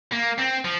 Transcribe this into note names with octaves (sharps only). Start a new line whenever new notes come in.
A#3
C4
F3